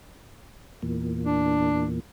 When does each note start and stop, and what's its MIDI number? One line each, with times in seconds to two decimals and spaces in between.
0.82 2.00 40
0.82 2.00 46
1.24 1.86 62